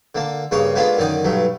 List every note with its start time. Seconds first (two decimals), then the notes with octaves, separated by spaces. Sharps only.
0.15 D3 A#3 A5
0.51 G2 C#3 A#3 C#5 C#6 D#6
0.75 G#3 A#3 B3 D4 F4 A4
0.98 F#2 D3 D#3 D#4 D5 D#6
1.24 B1 G2 F#3 A3